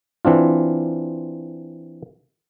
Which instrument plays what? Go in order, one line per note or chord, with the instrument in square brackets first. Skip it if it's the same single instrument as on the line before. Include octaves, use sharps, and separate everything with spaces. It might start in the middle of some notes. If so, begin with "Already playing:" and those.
[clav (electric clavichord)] E3 C4 D4 F4